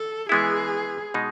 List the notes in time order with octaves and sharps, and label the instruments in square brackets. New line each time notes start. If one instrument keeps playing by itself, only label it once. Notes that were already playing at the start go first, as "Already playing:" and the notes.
Already playing: [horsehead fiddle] A4
[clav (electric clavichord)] E3 G#3 B3 E4 [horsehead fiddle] G#4
[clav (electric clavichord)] B2 G#3 D#4